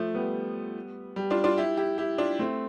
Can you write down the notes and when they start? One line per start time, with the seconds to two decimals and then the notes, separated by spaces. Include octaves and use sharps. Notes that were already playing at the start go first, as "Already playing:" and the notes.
Already playing: F3 A3
0.15 G3 B3
1.16 G3
1.30 D4 F4
1.44 D4 F4
1.58 E4 G4
1.77 E4 G4
1.98 E4 G4
2.18 D4 F4
2.39 A3 C4